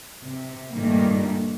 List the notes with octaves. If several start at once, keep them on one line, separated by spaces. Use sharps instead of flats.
C3
G2 A#2 D#3 G3 A3 A#3